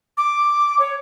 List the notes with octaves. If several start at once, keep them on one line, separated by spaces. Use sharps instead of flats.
D6
C#5